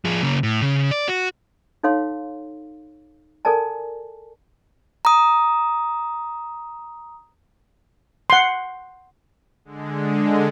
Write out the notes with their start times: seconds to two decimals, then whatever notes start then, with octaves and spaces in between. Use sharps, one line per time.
0.05 F3 G#4
0.23 C#3 A#3
0.43 A2
0.62 C#3
0.91 D5
1.08 F#4
1.83 D#4 A4 C#5 F5 C6
3.45 A4 A#4 D5 G#5 A5
5.05 A#5 D#6
8.30 F#5 C6
9.65 D3 G#3